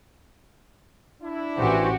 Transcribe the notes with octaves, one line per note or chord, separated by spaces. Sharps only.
D4 E4
A1 E3 F#4 G4 C5